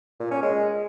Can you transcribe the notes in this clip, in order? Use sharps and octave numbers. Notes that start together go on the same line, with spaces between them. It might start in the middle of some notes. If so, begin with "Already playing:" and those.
A#2
C#4
G#3